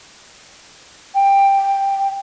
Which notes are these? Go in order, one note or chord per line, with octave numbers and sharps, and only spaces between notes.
G5